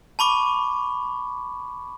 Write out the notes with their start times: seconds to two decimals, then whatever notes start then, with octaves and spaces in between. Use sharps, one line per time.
0.19 A5 B5 C#6 D6